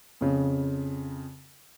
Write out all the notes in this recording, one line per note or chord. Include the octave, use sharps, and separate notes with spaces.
F2 C#3